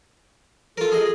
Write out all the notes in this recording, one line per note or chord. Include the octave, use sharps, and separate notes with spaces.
F4 A4 A#4
G#4 D#5